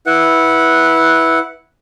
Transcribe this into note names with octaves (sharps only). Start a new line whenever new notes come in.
E4 B4 F#5